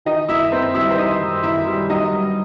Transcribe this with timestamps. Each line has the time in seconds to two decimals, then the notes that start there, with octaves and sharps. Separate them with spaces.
0.05 E3 D#4 D#5
0.29 F#2 E4 E5
0.52 F#2 C4 C5
0.74 G3 E4 E5
0.91 C5
0.98 E3 D#4 D#5
1.21 F#2
1.43 F#2 E4 E5
1.67 G3
1.89 F#3 D#4 D#5
2.12 G2